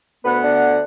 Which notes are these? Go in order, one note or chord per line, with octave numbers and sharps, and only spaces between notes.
D2 B3 B4 F#5
D3